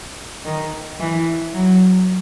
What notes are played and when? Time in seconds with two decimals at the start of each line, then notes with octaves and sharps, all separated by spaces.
0.45 D#3
1.00 E3
1.54 F#3